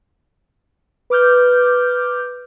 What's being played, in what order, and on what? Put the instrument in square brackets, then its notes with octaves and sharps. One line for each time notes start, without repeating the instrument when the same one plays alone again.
[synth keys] B4 D6 F6 G6